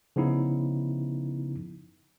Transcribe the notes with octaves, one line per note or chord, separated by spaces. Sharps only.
C#3 F3 B3 D#4 E4